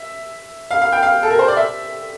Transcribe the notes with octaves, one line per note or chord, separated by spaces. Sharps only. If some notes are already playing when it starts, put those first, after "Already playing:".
Already playing: E5
F5
F5
G5
F5
A4
A#4
C5
D5
E5